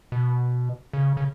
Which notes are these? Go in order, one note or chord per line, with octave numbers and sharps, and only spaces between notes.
B2
C#3
C#3